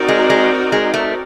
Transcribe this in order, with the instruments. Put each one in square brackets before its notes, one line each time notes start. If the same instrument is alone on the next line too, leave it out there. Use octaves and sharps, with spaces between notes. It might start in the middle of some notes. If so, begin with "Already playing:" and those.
Already playing: [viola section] C4 D#4 F#4 A#4 D5
[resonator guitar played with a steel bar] G#3
G#3
G#3
A3